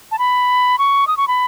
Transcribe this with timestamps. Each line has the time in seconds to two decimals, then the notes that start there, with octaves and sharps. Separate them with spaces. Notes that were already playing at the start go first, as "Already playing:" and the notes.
0.11 A5
0.19 B5
0.79 C#6
1.07 D#6
1.17 C#6
1.28 B5